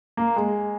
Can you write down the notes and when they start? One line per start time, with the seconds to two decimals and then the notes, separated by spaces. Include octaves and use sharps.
0.17 A#3
0.36 G#3